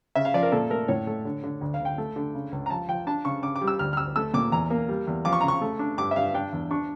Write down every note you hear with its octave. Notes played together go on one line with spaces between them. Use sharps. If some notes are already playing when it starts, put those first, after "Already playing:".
C#3 E5
F5
F3 D5
A#4
A#2 A4
A3 A#4
A2 C#5
A3
D3
D3
D2
F5
D2
G5
A3
D3
C#3
C#2
A#5
F3 A5
F3 G5
D4 A5
C#3 C#6
C#3 D6
D6
G3
E6
D2 F6
F6
D2 E6
A3 E6
A#2 D6
E2 A#5
A#3
G3
E2
F3 D6
C#6
C#3 A#5
C#6
A3
D4
G2 D6
E5
G2 F5
D4 G5
E2
D4 C#6